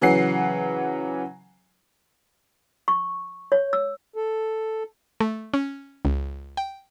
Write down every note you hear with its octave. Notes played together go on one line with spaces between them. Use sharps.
C#3 E3 F#3 F#5 C7
C#6
C#5
E6
A4
A3
C#4
C#2
G5